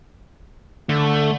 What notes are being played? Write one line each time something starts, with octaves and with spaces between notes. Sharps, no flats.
D3 A3